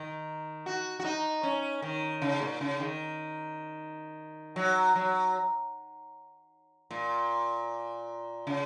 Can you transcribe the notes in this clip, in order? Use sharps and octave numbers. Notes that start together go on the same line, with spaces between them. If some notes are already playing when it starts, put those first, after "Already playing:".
Already playing: D#3
F#4
F#4
D#4
C#4
D#3
C#3
A#2
C#3
D#3
F#3
F#3
A#2
C#3